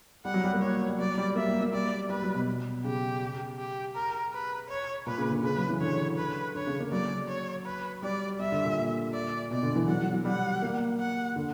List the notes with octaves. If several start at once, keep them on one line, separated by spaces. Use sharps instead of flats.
G3 F#5
F#3
G3
A#3
G3 C#5
G3
F#3 D5
G3
A#3 E5
G3
A#3
G3 D5
G3 B4
F#3
B2
C#3 G4
G4
A#4
B4
C#5
A#2 B4
C#3
D3
C#3 B4
F#3
E3
D3 C#5
B4
D3 C#5
C#3
A#3
F#3 D5
C#5
B4
G3 D5
G3 E5
D3
A#2
D5
B2 D5
D3
E3
F#3 F#5
F#3
F#3
G3 F#5
A#3
F#5
D3